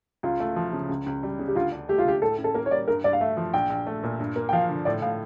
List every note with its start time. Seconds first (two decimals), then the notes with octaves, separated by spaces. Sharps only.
0.23 C#2 F4
0.40 A3
0.56 F3
0.73 C#3
0.89 C#2
1.06 C#2
1.23 G3
1.39 C#3
1.48 G4
1.55 D2 F4
1.72 D4
1.89 A3 G4
1.98 F4
2.05 D3 G4
2.22 A2 A4
2.38 C#4
2.44 A4
2.54 A#3 A#4
2.66 C#5
2.71 G3 D5
2.88 G2 A#4
3.04 G2 D5
3.13 F5
3.21 A3 E5
3.37 F3
3.53 A#1 G5
3.70 A#1
3.87 A3
4.03 A#2
4.20 G2
4.36 A#3
4.49 G5
4.53 F3 F5
4.69 D3
4.85 A2 D5
5.02 A2 F5